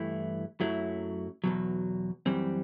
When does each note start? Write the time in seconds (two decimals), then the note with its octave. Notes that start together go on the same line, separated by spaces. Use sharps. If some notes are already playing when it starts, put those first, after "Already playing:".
Already playing: G2 E3 A3 E4
0.60 F#2 F#3 A3 E4
1.44 E2 B2 F#3
2.26 F#2 E3 G3 C4